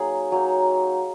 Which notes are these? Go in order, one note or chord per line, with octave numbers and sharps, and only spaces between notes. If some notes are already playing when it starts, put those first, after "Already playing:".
Already playing: F#3 A#3 D#4 G#4
F#3 A#3 D#4